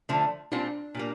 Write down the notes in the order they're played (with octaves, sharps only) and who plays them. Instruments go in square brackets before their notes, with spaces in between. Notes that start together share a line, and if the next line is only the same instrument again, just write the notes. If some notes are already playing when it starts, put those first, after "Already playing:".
[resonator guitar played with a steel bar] D3 F3 A3
[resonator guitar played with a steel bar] A#2 G3 C4 F4 A4 [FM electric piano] D4
[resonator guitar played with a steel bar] A#2 G3 A#3